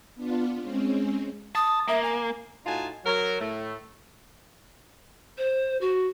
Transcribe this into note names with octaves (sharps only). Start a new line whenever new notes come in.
B3 D4 F4
G#3 C4 C#4
A5 D#6
A#3 E5
G#5
A2 D#4 F4 F#4 G#5 A5
F#3 A#4
A2 A3
C5
F#4